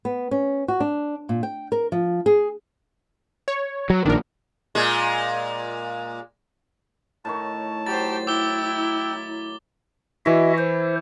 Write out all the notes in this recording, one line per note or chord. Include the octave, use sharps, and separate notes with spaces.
B3
C#4
F#4
D4
A#2
G5
A#4
F3
G#4
C#5
F#3
A#1 A#2 D#3 D4 A#4
A#2 G#3
A2 D#3 C#5 A5
F#3 G4 C5 A6
E4 G5 D6 E6 G7
E3 E4 F#4 D#5 E5
C5